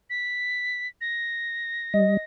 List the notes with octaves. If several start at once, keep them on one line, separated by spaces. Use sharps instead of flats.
B6
A#6
G3 D#5